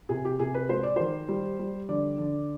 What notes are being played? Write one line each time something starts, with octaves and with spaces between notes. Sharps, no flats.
C3 G#4
G4
C3 G#4
B4
G#3 C5
D5
D#3 C5
G3
G3
D3 D5
D3